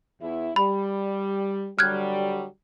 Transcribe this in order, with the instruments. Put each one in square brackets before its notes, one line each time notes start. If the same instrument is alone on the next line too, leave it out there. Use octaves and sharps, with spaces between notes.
[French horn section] E2 E4
[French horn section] G3 [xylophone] B5
[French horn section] D3 F#3 G3 [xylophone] F6 F#6 G#6